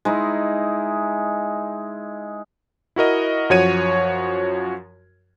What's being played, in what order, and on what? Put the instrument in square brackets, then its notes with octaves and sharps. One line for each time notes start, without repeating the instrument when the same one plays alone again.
[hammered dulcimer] G#3 D#4 E4
[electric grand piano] E4 F#4 A#4 D#5
F#2 F3 F#4 C#5 G#6 D#7